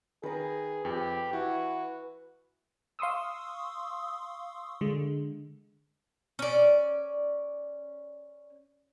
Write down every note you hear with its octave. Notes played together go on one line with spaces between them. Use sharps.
D#3 G#4 B4 A#5
F2 G4
E3 E4 F#4
F5 C6 C#6 D#6 E6
D3 G#3
C#4 D5